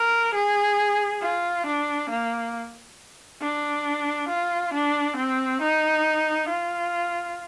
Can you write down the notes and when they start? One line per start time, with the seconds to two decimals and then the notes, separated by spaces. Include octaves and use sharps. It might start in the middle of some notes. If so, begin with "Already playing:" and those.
Already playing: A#4
0.34 G#4
1.22 F4
1.66 D4
2.10 A#3
3.41 D4
4.28 F4
4.73 D4
5.16 C4
5.61 D#4
6.49 F4